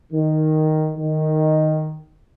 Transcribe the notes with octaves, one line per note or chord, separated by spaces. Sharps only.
D#3
D#3